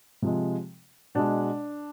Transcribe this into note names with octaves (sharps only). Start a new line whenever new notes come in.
C3 F3 G#3
B2 G#3 D4